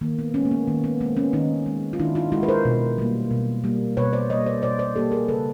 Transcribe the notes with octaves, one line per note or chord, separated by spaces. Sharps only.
D#3 A#3
B3
G#3 B3 C#4
A#3
B3
D#3 A#3
B3
G#3 A#3 C4
B3 C#4
D#3 C#4 D#4
G#3
F4
D#3 D4 E4
D#4 F4
G#3 E4 F#4
B4
A#4 C5
B2
G3 A#3
B2
G3 A#3
B2 B4 C#5
C5 D5
G3 A#3 C#5 D#5
C5 D5
B2 C5 D5
C5 D5
G3 A#3 G4 A4
G#4 A#4
C#3 A4 B4